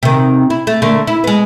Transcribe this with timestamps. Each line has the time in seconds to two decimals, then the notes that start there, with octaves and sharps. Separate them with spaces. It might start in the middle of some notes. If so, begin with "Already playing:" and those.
0.03 C3 D#3
0.50 E4
0.67 A3
0.82 D3 A3 A#3
1.07 E4
1.24 G#3 B3